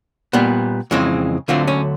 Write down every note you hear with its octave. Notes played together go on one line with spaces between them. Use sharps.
A#2 G3 B3
F2 C#3 E3 G#3 C4
D2 D3 F#3 A3 C4 F4
C#4